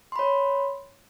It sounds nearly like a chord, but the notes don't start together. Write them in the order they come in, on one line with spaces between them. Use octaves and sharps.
C6 B5 C#5